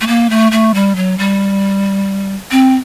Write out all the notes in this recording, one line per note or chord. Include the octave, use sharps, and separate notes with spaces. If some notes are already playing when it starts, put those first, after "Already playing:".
A3
A#3
A3
A3
G3
F#3
G3
C4